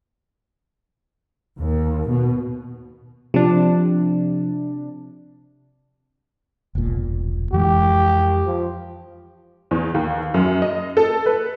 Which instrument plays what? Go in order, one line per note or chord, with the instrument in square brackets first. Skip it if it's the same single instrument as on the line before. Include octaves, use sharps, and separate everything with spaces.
[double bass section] D#2
B2
[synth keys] C3 D4 [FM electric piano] F3
[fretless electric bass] E1 C2 A#2
[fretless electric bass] F2 E3 G#3 [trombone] G4
[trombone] F3
[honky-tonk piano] E2
D#2
F#2
D#5
A4
B4